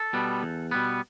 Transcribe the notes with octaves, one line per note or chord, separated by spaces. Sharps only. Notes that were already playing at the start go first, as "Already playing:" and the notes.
Already playing: A4
B2 G3 B3
E2
B2 G3 B3